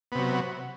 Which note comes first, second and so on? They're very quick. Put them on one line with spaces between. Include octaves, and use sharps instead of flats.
B3 C3 F#3